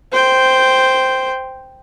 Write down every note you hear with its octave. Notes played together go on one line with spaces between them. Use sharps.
C5 G5